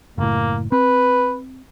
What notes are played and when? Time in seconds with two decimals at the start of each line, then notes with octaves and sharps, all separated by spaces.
0.18 F#1 A2 A#3
0.72 C4 B4